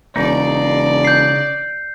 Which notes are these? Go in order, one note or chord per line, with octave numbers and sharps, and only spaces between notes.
E1 C#3 D#4 D5
G6 C7